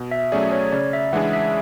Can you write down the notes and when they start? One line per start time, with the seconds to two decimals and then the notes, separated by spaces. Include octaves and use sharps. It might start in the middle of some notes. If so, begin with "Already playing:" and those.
Already playing: B2
0.11 E5
0.32 F#3 A3 C#4 G#4 D5
0.52 C#5
0.72 C#3 D5
0.93 E5
1.13 E3 G#3 D4 G#4 F#5
1.33 E5